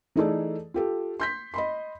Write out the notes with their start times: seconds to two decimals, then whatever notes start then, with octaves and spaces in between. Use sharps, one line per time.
0.16 E3 A3 D#4 G#4 A4 D5
0.74 F4 G4 A4
1.20 C6 G6 B6
1.54 D#5 B5 C6